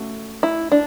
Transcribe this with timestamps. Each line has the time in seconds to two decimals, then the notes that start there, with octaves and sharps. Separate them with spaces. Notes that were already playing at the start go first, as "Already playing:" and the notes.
Already playing: A3 C#4 F#4 A4
0.43 E4
0.72 D4